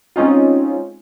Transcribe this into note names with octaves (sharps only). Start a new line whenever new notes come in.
G#3 C4 C#4 D#4 F4